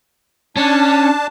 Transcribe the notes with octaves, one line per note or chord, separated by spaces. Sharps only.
C#4 D4 A5